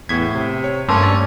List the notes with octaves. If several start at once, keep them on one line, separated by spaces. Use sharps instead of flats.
E2 A2 G#6 B6
C3
C#5
G2 A3 A#3 C#4 A5 C6 D6 E6
G3 D5